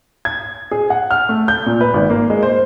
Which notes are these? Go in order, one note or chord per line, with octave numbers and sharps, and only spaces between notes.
G#6
G#4
F#5
F6
A3
G6
A#2
B4
G#1
A#3
G#3
C5